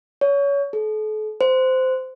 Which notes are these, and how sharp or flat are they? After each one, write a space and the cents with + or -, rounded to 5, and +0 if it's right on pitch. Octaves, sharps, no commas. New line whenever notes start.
C#5 +25
A4 -40
C5 -15